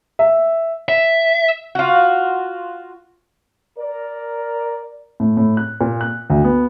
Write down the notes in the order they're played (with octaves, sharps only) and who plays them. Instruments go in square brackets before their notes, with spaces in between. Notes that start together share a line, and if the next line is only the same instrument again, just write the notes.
[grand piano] E5
[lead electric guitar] E5
[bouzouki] F4 F#4
[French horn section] A#4 D5
[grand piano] A2
A2
F#6
A#2
F#6
D2
B3